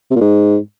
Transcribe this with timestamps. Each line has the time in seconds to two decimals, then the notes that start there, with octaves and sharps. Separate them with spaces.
0.11 C3
0.16 A#2
0.21 G#2